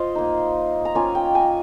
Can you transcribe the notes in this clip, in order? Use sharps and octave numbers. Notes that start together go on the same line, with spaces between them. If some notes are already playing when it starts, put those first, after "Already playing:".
Already playing: F4 C5 D#5 F5
A#3 D#4
A#5
A#3 C#4 F4 G#5
G5
G#5